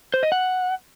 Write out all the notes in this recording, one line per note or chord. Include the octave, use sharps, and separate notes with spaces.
C5
D#5
F#5